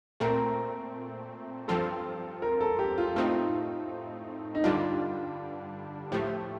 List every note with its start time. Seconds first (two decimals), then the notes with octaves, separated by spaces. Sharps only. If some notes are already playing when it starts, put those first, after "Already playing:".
0.20 A#2 A3 C4 A#4
1.68 G2 F3 C4 F4 A4
2.42 A#4
2.61 A4
2.79 G4
2.98 F4
3.16 A2 A3 C4 D#4 F4
4.55 D#4
4.64 G2 D3 G3 D4 F4
6.12 A2 F3 A3 G4